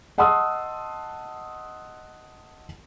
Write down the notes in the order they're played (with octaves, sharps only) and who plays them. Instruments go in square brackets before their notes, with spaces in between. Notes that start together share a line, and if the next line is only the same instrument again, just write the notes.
[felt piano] D#5 F#5 A5 C6 D#6 E6